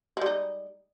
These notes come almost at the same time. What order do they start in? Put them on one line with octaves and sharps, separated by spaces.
G#3 G3 D#4